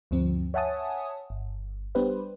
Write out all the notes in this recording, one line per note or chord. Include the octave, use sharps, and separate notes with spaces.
D2 G2 F3 C4
C#5 E5 F#5 G#5 A5 D#6
G1
G3 B3 D4 G4 B4 C5